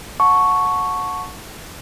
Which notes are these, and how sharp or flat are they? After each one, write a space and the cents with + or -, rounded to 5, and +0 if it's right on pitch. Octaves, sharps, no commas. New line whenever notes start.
F#5 -25 A5 +0 C#6 +0